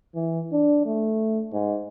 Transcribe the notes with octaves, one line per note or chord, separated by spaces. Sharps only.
E3
D4
A3
G#2